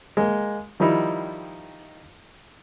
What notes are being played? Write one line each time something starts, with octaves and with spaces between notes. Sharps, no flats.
G#3 A#3
D#3 F3 G3 D#4 E4